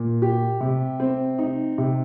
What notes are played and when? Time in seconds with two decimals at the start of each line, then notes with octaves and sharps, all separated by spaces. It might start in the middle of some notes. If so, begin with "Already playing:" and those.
Already playing: A#2
0.22 G4
0.60 C3
1.00 C4
1.38 D#4
1.78 C3